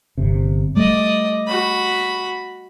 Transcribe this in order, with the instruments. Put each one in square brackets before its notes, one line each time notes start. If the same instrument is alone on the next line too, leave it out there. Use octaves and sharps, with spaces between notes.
[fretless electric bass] G1 C3
[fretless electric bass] G3 A3 [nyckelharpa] D5 D#5
[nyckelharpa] F#4 B5